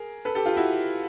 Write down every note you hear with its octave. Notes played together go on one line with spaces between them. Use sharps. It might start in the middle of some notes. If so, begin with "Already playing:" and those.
Already playing: G#4 A#4
A4 B4
G4 A4
F4 G4
E4 F#4